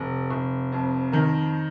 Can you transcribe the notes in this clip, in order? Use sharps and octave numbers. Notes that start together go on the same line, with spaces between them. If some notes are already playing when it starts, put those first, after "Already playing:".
Already playing: F1
F1
F2
D#3 A#4